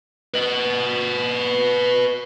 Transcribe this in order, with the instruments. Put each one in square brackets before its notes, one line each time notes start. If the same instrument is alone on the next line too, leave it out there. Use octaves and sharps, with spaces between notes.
[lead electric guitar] B4 D#5